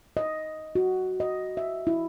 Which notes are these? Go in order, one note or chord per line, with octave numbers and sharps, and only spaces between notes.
D#5
F#4
D#5
E5
E4